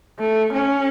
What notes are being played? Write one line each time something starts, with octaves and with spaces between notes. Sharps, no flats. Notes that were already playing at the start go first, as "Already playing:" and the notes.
A3
C#4